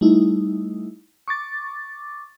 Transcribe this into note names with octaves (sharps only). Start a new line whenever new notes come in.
G3 A3 D#4 E4
C#6 D6 A6